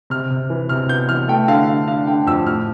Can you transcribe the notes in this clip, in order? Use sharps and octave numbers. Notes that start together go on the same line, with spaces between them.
C3 F6
C3
E3
C3 F6
B3 G6
E3 F6
A3 G5
D3 F5
D3
D4 F5
D3 G5
F2 E6
A2 F6